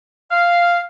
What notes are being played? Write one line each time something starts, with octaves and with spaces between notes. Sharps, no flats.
F5